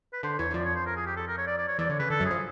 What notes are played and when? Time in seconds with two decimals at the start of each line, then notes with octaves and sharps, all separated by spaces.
0.13 B4
0.23 D3 C5
0.38 E2 E3 C#5
0.51 E3
0.54 F2 F3 D5
0.65 C#5
0.75 C5
0.86 A#4
0.96 G#4
1.06 G4
1.16 A4
1.27 A#4
1.38 C#5
1.47 D5
1.58 D5
1.68 C#5
1.78 E2 E3 D5
1.89 D3 C#5
1.99 C#3 B4
2.10 D3 A4
2.20 F#2 F#3
2.25 G#4
2.31 F3